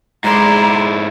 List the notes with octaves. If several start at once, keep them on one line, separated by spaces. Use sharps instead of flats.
G#2 G#3 E4 D5 A#5 C6